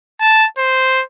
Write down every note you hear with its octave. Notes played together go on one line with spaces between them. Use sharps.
A5
C5